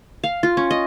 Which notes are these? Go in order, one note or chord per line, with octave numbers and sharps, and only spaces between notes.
F5
F4
C#4
D#5